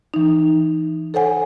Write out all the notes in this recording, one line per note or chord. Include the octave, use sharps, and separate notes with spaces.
E3 D#4
A4 C5 C#5 F#5 G#5